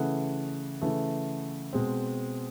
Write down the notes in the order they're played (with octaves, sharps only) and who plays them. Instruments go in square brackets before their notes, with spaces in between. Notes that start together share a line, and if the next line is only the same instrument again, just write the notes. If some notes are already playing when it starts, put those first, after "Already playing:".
Already playing: [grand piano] C#3 E3 A3 F#5
C#3 E3 A3
B2 G#3 C4